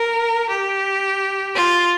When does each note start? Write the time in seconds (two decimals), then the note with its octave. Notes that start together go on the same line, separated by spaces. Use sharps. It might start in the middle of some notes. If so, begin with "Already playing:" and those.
Already playing: A#4
0.49 G4
1.54 F4